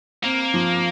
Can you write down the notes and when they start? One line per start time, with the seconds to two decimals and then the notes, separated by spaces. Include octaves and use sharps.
0.23 A#3 C4
0.54 F3